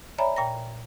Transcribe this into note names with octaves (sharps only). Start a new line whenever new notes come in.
C#5 D5 E5 G#5 A#5 B5
A#2 G5 A#5 A#6